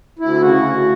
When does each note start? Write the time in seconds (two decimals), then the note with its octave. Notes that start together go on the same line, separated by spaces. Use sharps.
0.19 D2 E4
0.41 C#3 F#4
0.62 D2